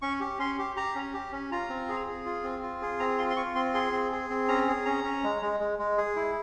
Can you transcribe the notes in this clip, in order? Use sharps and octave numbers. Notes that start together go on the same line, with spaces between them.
C#4 C#6
G4
C#4 C6
G4
G4 A#5
C#4
G4
C#4
F4 A#5
C4
G#4
G#4
F4
C4
F4
G#4
C4 A#5
F4 C6
C6
F4 C#6
C4 C6
G#4 C6
C4
G#4
C4
C#4 A#5
G#4
C#4 A#5
C#4
G#3
G#3
G#3
G#3
G#4
E4